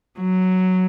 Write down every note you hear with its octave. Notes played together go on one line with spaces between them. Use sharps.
F#3